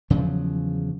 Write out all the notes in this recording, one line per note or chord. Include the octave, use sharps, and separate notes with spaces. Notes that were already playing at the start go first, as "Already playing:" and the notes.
E2 C#3 F3 F#3